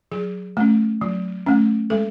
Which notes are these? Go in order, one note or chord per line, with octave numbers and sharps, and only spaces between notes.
F#3 G#4
A3 C#4
F#3
A3 C#4
G#3 A4